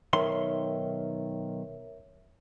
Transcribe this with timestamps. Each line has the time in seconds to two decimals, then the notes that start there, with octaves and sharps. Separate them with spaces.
0.13 B1 D#3 A#4 C#5 E5 C6